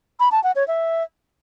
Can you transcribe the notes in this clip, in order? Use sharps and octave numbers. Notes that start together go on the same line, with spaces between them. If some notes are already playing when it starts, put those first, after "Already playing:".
B5
A5
F#5
C#5
E5